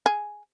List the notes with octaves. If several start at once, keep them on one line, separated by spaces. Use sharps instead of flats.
G#4